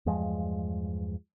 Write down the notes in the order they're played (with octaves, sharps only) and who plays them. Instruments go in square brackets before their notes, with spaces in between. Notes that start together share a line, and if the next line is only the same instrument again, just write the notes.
[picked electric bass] E2 G2 F3 G#3